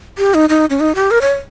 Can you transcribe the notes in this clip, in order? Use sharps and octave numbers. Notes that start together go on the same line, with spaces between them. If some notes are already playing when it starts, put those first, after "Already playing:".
G4
D#4
D#4
C#4
D#4
G4
A#4
C#5